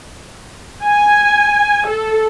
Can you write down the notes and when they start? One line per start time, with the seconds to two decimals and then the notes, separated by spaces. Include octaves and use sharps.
0.85 G#5
1.88 A4